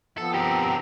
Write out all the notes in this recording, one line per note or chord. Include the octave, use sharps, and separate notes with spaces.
F3 B3 C4 A4
D3 G4 A#4